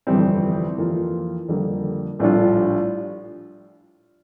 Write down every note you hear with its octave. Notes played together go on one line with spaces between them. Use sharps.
G1 F2 E3 G3 C4
F2 E3 A#3 F4
F2 D3 G3 A#3
A#1 A2 G3 D4 F4